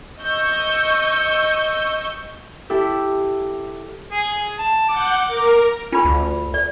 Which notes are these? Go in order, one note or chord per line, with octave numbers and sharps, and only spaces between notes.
D#5 C#6 E6 G6
E4 G4 A4
G#4
A5
F#5 D6 G6
A#4
C#4 F4 B5
D2
D5